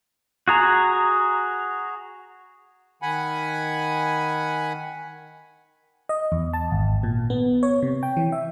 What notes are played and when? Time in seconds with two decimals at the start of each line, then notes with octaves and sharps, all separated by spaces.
0.48 F#4 G#4 A#5
3.02 D#3 F#5 G#5 B5
6.09 D#5
6.32 E2
6.53 A5
6.72 G#1
7.03 A#2
7.30 B3
7.63 C#5
7.83 C3
8.03 G5
8.17 E3
8.32 E5